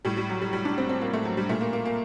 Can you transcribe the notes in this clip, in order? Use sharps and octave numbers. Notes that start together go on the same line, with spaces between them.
A2 G3
G3
F#3
G3
G3
D4
C4
C4
A#3
A3
F#3
G3
A#2 A3
A#3
A#3
A#3